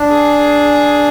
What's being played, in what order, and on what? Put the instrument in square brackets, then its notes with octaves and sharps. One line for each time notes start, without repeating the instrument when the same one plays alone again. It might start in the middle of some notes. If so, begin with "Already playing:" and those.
Already playing: [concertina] D4
[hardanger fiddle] G#4